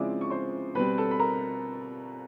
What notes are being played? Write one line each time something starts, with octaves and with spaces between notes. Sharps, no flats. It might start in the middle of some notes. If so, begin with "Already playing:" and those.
Already playing: C#3 F3 G#3 C4 E4 D5 D6
C#6
C5 C6
B2 G3 C4 B4 B5
A4 A5
B5
A#4 A#5